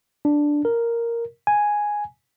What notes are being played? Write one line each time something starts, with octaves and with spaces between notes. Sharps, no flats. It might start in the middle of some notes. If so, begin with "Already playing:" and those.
D4
A#4
G#5